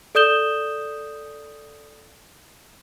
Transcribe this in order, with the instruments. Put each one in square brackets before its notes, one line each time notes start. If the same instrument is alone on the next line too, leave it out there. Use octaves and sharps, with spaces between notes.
[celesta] A4 D5 D#6 G6 E7 G7